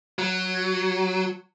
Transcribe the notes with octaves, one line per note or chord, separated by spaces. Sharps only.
F#3